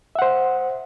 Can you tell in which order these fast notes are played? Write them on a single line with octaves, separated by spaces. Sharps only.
E5 F#5 C5